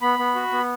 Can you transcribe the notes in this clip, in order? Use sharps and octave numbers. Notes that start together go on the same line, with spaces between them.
B3 B5
B3
F#4
B3